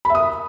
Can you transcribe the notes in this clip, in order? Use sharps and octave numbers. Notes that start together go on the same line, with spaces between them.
E5 B5 D#6